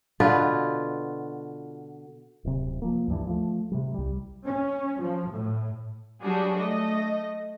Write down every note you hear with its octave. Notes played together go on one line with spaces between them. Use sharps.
B2 D3 F4 B4
D1 C3
F3 A#3
D2 G2 E3
F3 A3
C3 G3
C2 G3
C#4
F3
A2
F#3 G3 D4 F#4 G#4
A3 D#5